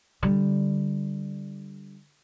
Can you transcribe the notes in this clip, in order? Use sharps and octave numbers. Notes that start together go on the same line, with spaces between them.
D3 G3